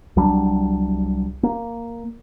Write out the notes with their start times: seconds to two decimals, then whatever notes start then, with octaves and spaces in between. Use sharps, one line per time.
0.16 C2 F#3 G3 D4
1.43 A#3